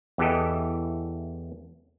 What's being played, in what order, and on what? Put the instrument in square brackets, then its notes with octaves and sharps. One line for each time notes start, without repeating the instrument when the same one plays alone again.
[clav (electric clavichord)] E2 E3 G4 A4 D#5